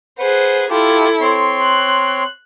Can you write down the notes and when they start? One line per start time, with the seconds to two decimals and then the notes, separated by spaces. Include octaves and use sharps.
0.19 G#4 B4 C5 F#5
0.70 E4 F4 G4 A4
1.21 C4 C#5 C6
1.63 F#6